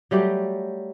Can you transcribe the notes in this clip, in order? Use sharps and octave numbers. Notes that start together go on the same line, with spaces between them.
F#3 G3 A3 G4